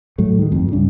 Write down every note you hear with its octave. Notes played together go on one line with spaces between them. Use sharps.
A2 F#3 A3
D#3 G#3
G1 F2
C2 G2 C#3 D4